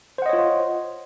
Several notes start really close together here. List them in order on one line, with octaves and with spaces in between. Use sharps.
C5 F#5 D#5 C#5 F4